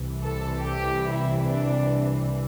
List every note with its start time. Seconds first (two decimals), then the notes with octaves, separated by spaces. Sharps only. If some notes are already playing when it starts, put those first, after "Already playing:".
Already playing: C2 C3 E3
0.22 A4
0.63 G4
1.05 E4
1.46 D4